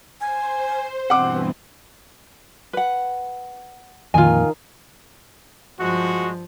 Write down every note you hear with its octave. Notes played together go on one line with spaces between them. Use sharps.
C5 G#5
G2 B2 E3 C4 F#5 D6
B4 F#5
F2 A#2 D#3 F4 G#5
G2 F3 G#3 F#4